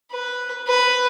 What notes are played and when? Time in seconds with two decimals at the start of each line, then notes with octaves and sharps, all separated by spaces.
0.12 B4
0.68 B4